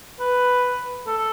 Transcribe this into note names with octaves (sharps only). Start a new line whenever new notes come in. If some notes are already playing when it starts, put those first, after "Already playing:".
B4
A4